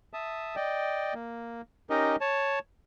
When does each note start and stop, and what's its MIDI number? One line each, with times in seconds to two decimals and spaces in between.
0.13 0.56 76
0.13 0.56 81
0.13 0.56 87
0.56 1.14 74
0.56 1.14 75
0.56 1.14 79
1.14 1.61 58
1.90 2.16 61
1.90 2.16 63
1.90 2.16 67
1.90 2.16 70
1.90 2.16 75
2.21 2.59 73
2.21 2.59 81